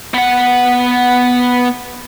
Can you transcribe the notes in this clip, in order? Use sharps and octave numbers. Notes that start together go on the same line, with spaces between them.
B3 F#5